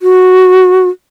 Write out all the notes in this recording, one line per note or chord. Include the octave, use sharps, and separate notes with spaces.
F#4